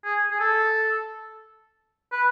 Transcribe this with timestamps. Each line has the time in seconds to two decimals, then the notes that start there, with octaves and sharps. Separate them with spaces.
0.05 G#4
0.31 G#4
0.40 A4
2.12 B4